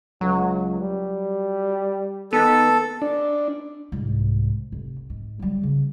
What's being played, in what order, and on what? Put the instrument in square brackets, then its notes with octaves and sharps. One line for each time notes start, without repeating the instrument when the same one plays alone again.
[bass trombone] C#2 [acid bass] F#3
[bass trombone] G3
[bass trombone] D#3 [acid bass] B3 [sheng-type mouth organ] A4
[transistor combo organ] D4
[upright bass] C2 G#2
F1
G#2
F#3 G3
C#3